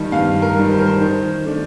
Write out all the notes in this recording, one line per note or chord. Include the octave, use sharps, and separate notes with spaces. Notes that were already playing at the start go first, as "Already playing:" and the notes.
Already playing: G2 D#3 G3
G2 F5
A#4
D#3 G3
C5
A#4
C5
D#3
A3 D4